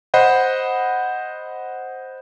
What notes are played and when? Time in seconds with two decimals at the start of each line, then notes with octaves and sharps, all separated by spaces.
0.14 C5 D#5 F#5 B5